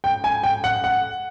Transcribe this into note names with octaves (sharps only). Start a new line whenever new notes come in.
G5
G#5
G5
F#5
F#5